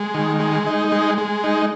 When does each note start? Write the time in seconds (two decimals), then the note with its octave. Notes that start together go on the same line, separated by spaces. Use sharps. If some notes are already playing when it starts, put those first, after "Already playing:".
Already playing: G#3
0.14 D#3
0.40 G#3
0.66 D#4
0.92 G#3
1.18 G#3
1.44 D#4